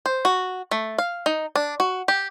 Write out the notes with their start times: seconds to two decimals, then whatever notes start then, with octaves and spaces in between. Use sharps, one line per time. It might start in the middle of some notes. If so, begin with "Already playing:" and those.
0.06 C5
0.25 F#4
0.71 A3
0.98 F5
1.26 D#4
1.56 D4
1.80 F#4
2.08 G4